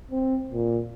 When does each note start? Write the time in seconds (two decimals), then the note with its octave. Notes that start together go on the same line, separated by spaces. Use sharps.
0.12 C4
0.52 A#2